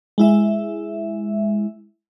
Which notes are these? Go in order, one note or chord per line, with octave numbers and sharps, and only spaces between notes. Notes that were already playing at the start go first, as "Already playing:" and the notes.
G#3 E4 E5